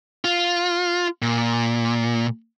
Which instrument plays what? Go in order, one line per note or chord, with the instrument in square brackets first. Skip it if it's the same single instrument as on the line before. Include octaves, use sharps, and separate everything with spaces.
[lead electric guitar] F4
A#2